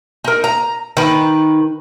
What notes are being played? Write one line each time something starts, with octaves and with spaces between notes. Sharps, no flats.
D#4 A#4
A#5
D#3 B4